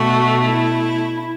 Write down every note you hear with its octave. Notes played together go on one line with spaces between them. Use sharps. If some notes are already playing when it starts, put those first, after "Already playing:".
Already playing: B2 A3 F#4
E4